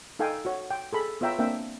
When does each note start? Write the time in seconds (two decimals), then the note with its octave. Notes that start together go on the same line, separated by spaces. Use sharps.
0.19 D#4 A4 F5 G5 G#5
0.45 F#4 C#5
0.71 G5
0.93 G#4 A4 B5
1.21 B3 F4 C#5 E5 G5 A#5
1.39 A#3 C4 D4 E5 G5